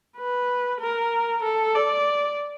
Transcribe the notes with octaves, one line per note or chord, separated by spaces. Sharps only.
B4
A#4
A4
D5